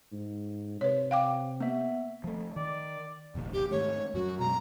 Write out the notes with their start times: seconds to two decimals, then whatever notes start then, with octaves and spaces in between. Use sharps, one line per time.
0.12 G#2
0.81 C3 B4 C#5
1.11 F5 G5 D6
1.60 A#3 B3 E5
2.24 F3 A3
2.56 D#3 D5
3.35 F1 A#1 D#2
3.53 G4
3.71 G#2 D#3 A3 C#5
4.14 F#2 F#3 F#4
4.39 B2 F#3 G#3 A#5